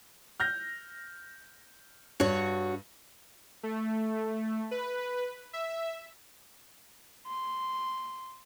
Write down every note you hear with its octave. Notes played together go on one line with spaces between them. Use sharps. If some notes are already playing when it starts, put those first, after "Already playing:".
F6 G6 A#6
G2 F#4 C#5
A3
B4
E5
C6